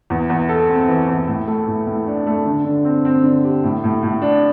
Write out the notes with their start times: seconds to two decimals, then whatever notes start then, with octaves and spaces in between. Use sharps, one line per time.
0.10 E2
0.30 E2
0.49 A4
0.69 C4
0.88 E3
1.08 E2
1.28 A2
1.48 A3
1.67 A2
1.87 A2
2.07 D4
2.27 A3
2.46 D3
2.65 D3
2.85 C4
3.05 C4
3.24 D3
3.44 G4
3.64 A2
3.84 A2
4.03 A2
4.22 D4